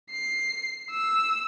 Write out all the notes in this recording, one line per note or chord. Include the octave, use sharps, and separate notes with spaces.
C7
E6